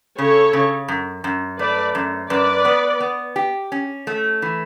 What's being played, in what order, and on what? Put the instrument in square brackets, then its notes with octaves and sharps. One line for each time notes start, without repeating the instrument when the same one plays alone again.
[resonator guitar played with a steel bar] C#3 [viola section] A4 C#5
[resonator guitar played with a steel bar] C#3
F#2
F#2
[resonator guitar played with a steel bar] A3 [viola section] B4 D5
[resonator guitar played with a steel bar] F#2
[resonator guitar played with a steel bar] F#2 [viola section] B4 D5
[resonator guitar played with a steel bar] B3
B3
G4
C#4
A3
E3